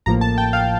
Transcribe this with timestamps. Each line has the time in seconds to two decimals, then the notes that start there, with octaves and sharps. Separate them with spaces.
0.06 A1 A2 F3 A#3 A#5
0.21 A5
0.38 G5
0.53 F5